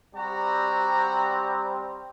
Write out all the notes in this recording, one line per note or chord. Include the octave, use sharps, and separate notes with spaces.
G3 C4 F#4 A#5